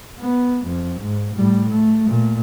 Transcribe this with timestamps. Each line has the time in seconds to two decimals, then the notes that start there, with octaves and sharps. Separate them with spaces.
0.19 B3
0.66 F2
1.01 G#2
1.35 A2 G3
1.70 A3
2.07 A#2 A3